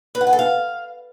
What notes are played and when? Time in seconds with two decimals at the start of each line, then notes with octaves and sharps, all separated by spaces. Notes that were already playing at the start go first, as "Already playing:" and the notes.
0.15 B4
0.21 F#5
0.27 G#5
0.33 A4
0.39 F5